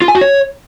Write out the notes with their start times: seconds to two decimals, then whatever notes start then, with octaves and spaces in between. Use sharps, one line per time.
0.02 F4
0.08 G#5
0.15 F#4
0.21 C#5